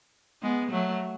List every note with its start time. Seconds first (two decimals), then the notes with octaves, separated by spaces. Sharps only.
0.42 G#3 B3
0.71 F#3 A3